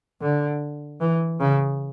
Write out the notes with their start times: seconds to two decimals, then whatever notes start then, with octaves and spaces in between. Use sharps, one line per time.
0.21 D3
1.00 E3
1.40 C#3